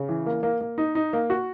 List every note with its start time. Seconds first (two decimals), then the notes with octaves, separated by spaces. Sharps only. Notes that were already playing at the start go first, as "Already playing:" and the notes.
Already playing: C#3
0.09 E3
0.26 A#3
0.43 A#3
0.61 A#3
0.78 D#4
0.95 D#4
1.13 A#3
1.30 F#4